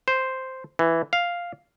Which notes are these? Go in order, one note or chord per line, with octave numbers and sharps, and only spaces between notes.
C5
E3
F5